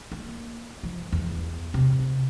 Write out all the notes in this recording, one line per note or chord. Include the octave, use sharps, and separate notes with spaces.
A#3
F3
E2
C3